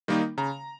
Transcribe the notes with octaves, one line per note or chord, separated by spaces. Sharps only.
D#3 G3 A#3 D#4
C#3 A#5